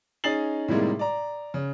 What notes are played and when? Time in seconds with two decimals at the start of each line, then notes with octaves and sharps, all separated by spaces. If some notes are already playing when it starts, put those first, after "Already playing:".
0.24 C#4 D#4 G#4 A6 C7 F#7
0.68 A2 C3 D#3 G3 G#3 A#3
0.99 D5 A#5
1.54 C#3